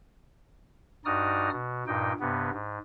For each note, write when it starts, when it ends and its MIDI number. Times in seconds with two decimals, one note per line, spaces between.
1.05 1.50 43
1.05 1.50 63
1.05 1.50 66
1.05 1.50 74
1.05 1.50 87
1.05 1.50 89
1.52 1.84 47
1.87 2.12 43
1.87 2.12 46
1.87 2.12 63
1.87 2.12 79
2.20 2.50 43
2.20 2.50 48
2.20 2.50 59
2.53 2.78 44